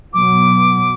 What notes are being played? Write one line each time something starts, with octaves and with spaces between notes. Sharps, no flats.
B2 F#3 B3 D6